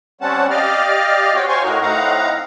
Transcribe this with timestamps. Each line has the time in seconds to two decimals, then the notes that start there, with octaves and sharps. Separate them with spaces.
0.21 G3 C4 C#4 F#5 A5
0.50 G4 D5 D#5 F5 F6
1.35 C4 F#4 C#5 F5 G5
1.49 C5 C#5 F5 G#5 C6 C#6
1.63 A2 D#4 F#4 A#4
1.82 A2 C4 D#4 F5 F#5 A#5